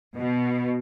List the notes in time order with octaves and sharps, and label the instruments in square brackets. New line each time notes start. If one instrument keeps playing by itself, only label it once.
[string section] B2